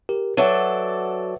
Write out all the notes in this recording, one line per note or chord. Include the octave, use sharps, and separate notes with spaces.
G4 A#4
F#3 A4 B4 D5 E5 F#5